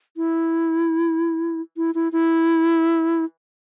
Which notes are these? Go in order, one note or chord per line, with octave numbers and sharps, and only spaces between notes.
E4
E4
E4
E4